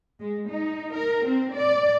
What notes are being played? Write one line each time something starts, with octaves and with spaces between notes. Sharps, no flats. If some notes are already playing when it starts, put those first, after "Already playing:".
G#3
D#4
A#4
C4
D5